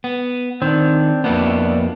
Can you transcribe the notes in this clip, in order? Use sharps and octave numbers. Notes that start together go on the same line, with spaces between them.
B3
D#3 C4 D4
F2 A#3 B3 D4 E4 F#4